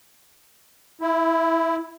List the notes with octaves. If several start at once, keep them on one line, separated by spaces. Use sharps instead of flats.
E4